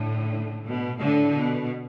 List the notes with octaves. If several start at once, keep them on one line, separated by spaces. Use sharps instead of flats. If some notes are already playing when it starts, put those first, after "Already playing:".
Already playing: A2 D3
B2
A2 D3
B2